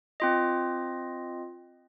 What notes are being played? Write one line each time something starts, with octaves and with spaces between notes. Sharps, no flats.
C4 F4 D#5